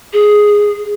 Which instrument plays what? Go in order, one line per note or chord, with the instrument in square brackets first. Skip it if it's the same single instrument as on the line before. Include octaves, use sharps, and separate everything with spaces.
[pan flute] G#4